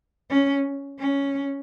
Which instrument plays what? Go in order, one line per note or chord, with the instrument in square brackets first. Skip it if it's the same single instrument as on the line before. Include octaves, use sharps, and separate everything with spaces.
[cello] C#4
C#4